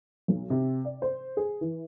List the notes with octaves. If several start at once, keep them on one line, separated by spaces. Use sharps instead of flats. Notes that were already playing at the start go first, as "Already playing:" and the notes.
B1
C3
D5
C5
G#4
E3